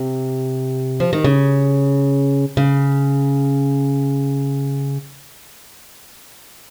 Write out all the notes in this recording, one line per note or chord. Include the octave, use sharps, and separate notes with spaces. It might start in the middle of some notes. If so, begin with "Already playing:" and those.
Already playing: C3
F3
D#3
C#3
C#3